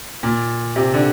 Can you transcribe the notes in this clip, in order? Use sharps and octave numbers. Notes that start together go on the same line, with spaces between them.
A#2
C3
D3